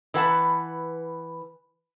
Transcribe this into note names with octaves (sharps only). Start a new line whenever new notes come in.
E3 B4 F#5 A5